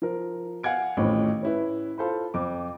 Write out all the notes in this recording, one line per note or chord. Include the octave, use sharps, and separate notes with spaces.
F3 A#4
F5 F#5 G#5 G#6 D7
A1 F2 A2 D#3 F3
C#4 E4 B4
F4 A4 C5 B5
F2 D6